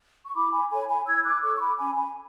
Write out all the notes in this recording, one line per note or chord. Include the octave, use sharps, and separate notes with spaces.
C#6
E4 B5 D6
G#5 B5
A4 C#5 G#5 B5
G#5 B5
E4 E6 G#6
D6 F#6
A4 C#5 C#6 E6
C#6
B5 D6
C#4 G#5 B5
G#5 B5